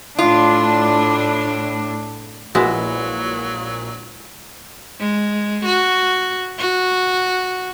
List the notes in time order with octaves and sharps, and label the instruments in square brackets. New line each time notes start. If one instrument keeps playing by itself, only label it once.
[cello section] A2 D4 [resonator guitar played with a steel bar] F4
[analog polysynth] A#1 A#2 [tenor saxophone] F#3 [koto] G#3 B3 E4 [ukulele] F#4
[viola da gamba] G#3
F#4
F#4